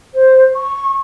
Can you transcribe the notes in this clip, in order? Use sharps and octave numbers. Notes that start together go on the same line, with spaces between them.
C5
C#6